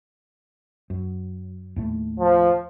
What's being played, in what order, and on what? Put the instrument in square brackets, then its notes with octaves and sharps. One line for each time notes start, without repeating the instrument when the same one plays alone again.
[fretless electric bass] F#2
D#2 A2 A3
[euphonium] F3